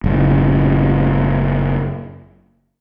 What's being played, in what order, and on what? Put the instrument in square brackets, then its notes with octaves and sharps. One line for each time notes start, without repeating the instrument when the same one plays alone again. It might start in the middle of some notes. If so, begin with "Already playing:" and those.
[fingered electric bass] F#1 A2